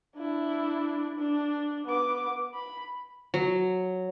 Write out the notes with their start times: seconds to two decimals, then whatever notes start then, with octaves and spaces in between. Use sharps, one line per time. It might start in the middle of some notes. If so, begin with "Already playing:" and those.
0.16 D4 E4
1.18 D4
1.86 B3 D6
2.54 B5
3.34 F#3